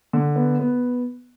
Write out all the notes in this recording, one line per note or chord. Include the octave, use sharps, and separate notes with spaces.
D3
B3
B3